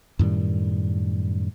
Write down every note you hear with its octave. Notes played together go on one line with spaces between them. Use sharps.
F#2 A2 D#3 G3